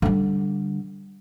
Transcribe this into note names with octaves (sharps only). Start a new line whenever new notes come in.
D3 G3